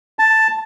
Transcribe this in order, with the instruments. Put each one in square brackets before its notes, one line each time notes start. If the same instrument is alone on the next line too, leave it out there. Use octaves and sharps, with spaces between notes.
[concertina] A5